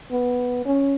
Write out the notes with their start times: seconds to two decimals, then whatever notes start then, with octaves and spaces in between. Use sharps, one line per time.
0.11 B3
0.65 C#4